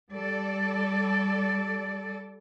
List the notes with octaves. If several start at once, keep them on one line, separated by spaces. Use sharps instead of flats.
G3 A4 D5